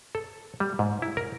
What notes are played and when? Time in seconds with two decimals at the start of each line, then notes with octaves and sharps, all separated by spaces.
0.15 A4
0.60 G3
0.79 G#2
1.02 E4
1.17 A#4